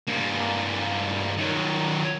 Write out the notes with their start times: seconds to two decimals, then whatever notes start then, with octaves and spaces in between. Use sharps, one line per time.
0.08 G2 A#3
1.37 D#3 F#3